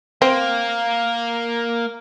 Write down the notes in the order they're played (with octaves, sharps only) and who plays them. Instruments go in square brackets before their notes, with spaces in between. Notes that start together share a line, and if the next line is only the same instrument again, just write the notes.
[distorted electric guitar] A#3 [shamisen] C4